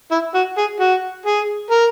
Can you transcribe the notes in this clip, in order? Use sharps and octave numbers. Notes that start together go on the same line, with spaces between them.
E4
F#4
G#4
F#4
G#4
A#4